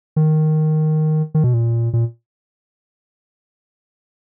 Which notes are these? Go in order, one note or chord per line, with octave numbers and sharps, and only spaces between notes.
D#3
D#3
B2
A#2
A#2